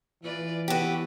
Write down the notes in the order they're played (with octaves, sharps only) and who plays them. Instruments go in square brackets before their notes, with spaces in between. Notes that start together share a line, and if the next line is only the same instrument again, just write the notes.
[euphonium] E3 [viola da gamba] F4 B4 D5
[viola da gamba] B3 A4 B4 [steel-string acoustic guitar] F#4 G4